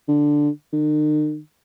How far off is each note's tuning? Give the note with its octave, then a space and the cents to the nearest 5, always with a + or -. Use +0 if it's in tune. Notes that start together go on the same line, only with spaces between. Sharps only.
D3 +0
D#3 -45